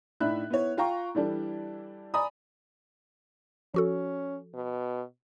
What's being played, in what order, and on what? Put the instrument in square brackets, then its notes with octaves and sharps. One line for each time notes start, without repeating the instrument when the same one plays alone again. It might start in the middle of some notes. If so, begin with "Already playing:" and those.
[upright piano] A2 D4 D#4 E5 B5 F#6
B3 E4 C#5
F4 F5 G5 A#5 C#6
E3 G3 D4 A4
D5 G#5 A#5 B5 D#6
[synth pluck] F3 F#4 A4 [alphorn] C#4
[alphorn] B2